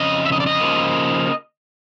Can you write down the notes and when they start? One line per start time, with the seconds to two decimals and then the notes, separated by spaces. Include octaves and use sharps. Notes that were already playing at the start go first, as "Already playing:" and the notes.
Already playing: F2 C#3 D#5
0.26 E5
0.32 D#5
0.40 D5
0.46 D#5
0.60 C#3 F3 A#3